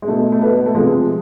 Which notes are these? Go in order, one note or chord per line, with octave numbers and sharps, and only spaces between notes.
G#3
B2 A3
A3
B2 B3
B3
A3
C3 F3 G#3